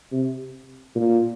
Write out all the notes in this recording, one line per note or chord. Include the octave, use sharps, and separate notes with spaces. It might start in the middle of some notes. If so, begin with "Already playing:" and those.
C3
A#2